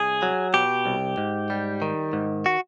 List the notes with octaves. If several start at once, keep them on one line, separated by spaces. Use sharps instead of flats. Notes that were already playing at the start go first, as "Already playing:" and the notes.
Already playing: C2 G#4
F#3
B2 G4
C2
G#2
G3
D#3
G#2
F#4